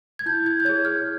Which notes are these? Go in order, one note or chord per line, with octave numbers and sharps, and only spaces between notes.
G#6
E4 G6
G#6
G6
G#4 C#5 G#6
F6